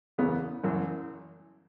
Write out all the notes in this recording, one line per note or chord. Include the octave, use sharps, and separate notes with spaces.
F#1 E2 C#3 E3 B3
F#1 F#2 E3